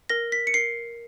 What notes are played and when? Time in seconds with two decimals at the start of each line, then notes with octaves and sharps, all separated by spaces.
0.09 A#4 A#6
0.32 B6
0.47 C#7
0.54 A#4 C7